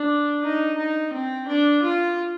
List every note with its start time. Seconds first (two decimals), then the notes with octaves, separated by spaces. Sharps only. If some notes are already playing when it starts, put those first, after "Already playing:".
Already playing: D4
0.44 D#4
0.78 D#4
1.13 C4
1.48 D4
1.83 F4